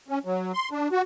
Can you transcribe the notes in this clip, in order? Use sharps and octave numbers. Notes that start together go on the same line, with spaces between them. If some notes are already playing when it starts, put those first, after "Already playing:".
C#4
F#3
C6
D4
F#4